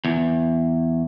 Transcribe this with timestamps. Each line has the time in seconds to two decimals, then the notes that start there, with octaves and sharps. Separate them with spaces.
0.05 E2